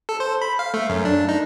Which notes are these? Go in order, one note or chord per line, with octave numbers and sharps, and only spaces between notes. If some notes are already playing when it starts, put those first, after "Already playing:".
A4
C5
B5
F5
A3
F#2
D4
D#4